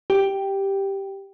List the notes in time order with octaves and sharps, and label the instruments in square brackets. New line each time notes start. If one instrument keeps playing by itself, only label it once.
[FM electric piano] G4